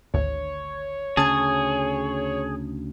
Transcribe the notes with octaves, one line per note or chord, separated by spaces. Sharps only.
G#1 D2 C#5
D2 C#3 C#4 G#4 A5 G#6